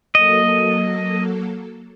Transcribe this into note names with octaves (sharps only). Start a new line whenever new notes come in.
F#3 A#3 A4 D#5